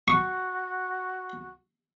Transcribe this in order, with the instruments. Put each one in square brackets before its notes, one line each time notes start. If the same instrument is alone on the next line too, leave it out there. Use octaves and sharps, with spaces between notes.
[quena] F#4 [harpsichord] C#6